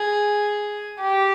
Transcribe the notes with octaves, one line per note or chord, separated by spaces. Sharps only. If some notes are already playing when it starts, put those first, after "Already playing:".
Already playing: G#4
G4